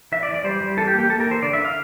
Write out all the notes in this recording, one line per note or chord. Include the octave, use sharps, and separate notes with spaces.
E3 E5
D5
E3
D5
G3 C5
G3
E3 A4
G4
A#3
G4
A#3 A4
A#4
E3 C5
D3 D5
E5
D3
F5